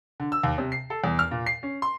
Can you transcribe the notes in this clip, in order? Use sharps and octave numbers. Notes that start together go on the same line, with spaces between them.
D3
E6
D#2
C3
C7
A4
E2
F6
A#2
C7
C#4
C6